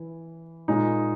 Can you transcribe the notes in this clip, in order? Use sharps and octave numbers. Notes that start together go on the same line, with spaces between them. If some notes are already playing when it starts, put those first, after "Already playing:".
Already playing: E3
A#2 G#3 D#4